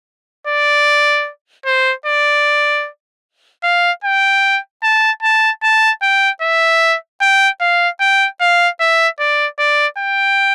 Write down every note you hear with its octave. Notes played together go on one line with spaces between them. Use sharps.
D5
C5
D5
F5
G5
A5
A5
A5
G5
E5
G5
F5
G5
F5
E5
D5
D5
G5